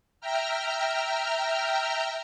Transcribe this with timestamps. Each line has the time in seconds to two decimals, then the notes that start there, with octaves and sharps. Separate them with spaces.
0.21 E5 G5 A#5 F6